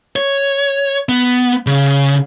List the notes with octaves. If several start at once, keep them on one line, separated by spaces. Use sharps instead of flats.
C#5
B3
C#3